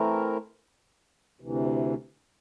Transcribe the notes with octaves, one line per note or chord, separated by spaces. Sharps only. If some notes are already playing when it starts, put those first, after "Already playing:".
Already playing: E3 A3 C4 E4 A#4
D2 C3 E3